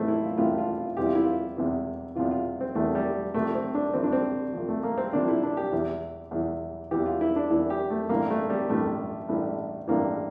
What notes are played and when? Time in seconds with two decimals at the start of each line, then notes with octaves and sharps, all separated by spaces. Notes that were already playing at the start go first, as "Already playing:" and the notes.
Already playing: A1 A2 E3 A3 C4
0.08 E4
0.23 F4
0.37 A1 A2 E3 F4
0.58 F4
0.77 F4
0.97 E2 C3 E3 G4
1.06 F4
1.15 E4
1.23 F4
1.57 E2 C3 E3
2.16 E2 C3 E3 F4
2.31 F4
2.61 C4
2.75 E2 C3 E3 A3
2.95 G3
3.34 C2 C3 F3 A3
3.55 C4
3.75 D4
3.93 C2 C3 F3 C4
4.04 D4
4.12 C4
4.53 C2 C3 F3
4.69 A3
4.83 A#3
4.98 C4
5.13 C2 C3 F3 D4
5.28 E4
5.43 D4
5.57 G4
5.72 E2 E3
6.31 E2 E3
6.91 E2 E3 G4
7.06 F4
7.21 E4
7.36 D4
7.50 E2 E3 E4
7.70 G4
7.90 A3
8.09 A1 G2 E3 A#3
8.30 A3
8.50 G3
8.69 A1 G2 E3 A3
9.29 A1 G2 E3
9.88 A1 G2 E3 A#3